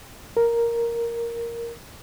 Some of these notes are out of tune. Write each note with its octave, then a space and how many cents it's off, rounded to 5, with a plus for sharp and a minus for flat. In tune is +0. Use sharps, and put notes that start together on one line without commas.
A#4 +0